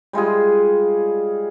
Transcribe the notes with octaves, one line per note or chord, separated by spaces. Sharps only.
G3 G#3 F4 G#4